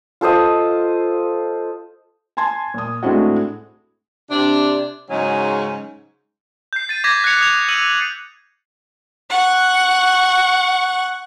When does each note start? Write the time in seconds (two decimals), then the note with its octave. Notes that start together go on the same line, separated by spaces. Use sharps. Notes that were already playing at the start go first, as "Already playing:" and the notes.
0.21 F4 A4 C5 D#5
2.37 G#5 A5 C6 G#6
2.74 A#2 D#6
3.03 A2 G#3 C4 D4 E4 F#4
4.31 C3 D4
5.10 G#2 C#3 F#3 G#3 C#4 D#4
6.73 G6 C7
6.89 A6 C7 D#7
7.04 D6 G#6 A#6 B6
7.24 F#6 G#6 C7 C#7 F7
7.41 D#6 G#6 F7
7.69 E6 D#7 F#7
9.30 F#5 C#6